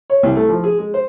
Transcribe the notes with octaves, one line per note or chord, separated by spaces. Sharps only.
C#5
C2
A3
F3
G#4
G#3
C5